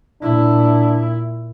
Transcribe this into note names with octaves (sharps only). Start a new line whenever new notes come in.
A#2 D4 E4